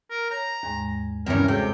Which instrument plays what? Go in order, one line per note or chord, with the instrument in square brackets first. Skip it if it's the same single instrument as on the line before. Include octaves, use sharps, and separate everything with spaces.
[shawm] A#4
[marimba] C#5 G6 A#6 [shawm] A#5
[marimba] D#2 G#2 G#3 [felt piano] G#5
[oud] G2 C#4 [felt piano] C3 E3 [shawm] A#4
[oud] C3 [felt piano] G#3 F#4 [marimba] A4 C#5 A5 [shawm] G5